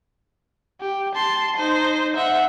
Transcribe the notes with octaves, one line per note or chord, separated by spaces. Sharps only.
G4
A5 C6
D#4 C5
E5 F#5